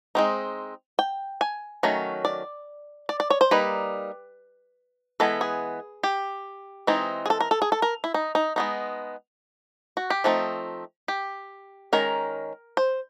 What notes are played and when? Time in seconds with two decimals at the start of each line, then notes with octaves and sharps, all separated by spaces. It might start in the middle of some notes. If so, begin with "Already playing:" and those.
0.15 G#3 C4 D#4
0.99 G5
1.41 G#5
1.83 D#3 F#3 A3 C#4
2.25 D5
3.09 D5
3.20 D5
3.30 C#5
3.41 C5
3.51 G3 A#3 D#4 B4
5.20 E3 G#3 B3 A4
5.41 G#4
6.03 G4
6.87 E3 G#3 C4 D#4
7.26 G#4
7.30 A4
7.40 A#4
7.51 A4
7.62 G#4
7.72 A4
7.82 A#4
8.04 E4
8.14 D#4
8.35 D#4
8.56 G#3 B3 D#4
9.97 F#4
10.10 G4
10.24 F3 A3 C4 D#4
11.08 G4
11.93 D#3 G#3 C#4 A#4
12.77 C5